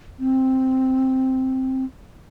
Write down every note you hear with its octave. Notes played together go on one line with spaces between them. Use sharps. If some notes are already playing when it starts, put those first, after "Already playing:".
C4